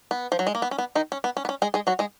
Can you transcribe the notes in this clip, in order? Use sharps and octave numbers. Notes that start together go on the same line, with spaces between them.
B3
F3
F#3
G#3
A#3
B3
C#4
B3
D#3 D#4
C#4
B3
C#4
B3
C#4
G#3 G#4
G#3 G#4
F#3 F#4
G#3 G#4